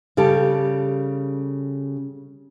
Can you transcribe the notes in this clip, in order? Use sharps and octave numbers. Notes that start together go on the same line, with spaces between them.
C#3 G3 G4 A4